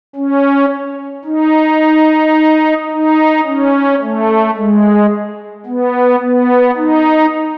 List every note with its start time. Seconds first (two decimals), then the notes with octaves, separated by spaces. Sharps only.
0.16 C#4
1.25 D#4
2.91 D#4
3.46 C#4
4.01 A3
4.56 G#3
5.66 B3
6.21 B3
6.76 D#4